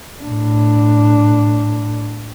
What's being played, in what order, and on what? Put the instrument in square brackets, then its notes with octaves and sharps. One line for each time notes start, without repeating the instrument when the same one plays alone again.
[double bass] A2 D4